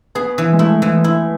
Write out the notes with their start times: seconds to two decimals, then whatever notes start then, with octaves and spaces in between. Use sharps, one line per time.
0.15 B3 G#4
0.38 E3
0.53 G#3
0.59 A3 E4
0.82 E3
1.04 E4